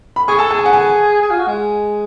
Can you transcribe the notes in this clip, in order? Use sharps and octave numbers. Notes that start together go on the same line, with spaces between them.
B5
G#4 C#6
A4 A5
G#4 A5
G#5
F#5
G#5
G#4
F4
F#4
G#3